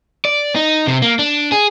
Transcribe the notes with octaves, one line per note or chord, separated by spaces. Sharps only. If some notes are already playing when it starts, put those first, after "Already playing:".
D5
D#4
C3
A#3
D4
G#4